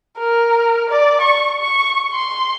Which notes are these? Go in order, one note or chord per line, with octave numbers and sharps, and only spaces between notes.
A#4
D5
C#6
C#6
C6